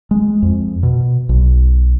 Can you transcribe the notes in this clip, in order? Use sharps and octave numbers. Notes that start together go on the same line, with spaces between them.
G#3
F2
B2
B1